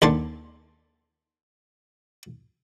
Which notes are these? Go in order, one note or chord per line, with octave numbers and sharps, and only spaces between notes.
D#2 D3 A5 C6